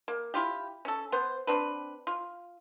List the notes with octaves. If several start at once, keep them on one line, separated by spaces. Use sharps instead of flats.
A#3
E4 F4 G4
C#4 A4
B3 C5
C4 D4 B4
F4